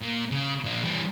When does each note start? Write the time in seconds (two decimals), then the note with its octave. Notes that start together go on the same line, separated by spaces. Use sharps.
0.02 A#2
0.31 C#3
0.64 A#2 D4
0.84 E3 G3